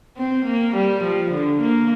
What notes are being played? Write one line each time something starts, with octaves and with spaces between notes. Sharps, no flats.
C4
A#3
G3
F3
D3
A#3